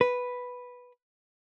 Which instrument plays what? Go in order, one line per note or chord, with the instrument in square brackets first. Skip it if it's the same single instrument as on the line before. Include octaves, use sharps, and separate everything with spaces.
[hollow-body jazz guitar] B4